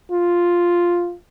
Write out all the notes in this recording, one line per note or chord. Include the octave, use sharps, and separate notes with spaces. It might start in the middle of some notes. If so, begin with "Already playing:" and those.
F4